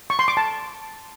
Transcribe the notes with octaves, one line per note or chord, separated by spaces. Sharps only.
C#6
C6
D6
A5